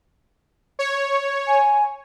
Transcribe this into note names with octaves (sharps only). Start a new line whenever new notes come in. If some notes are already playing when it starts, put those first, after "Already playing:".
C#5
G#5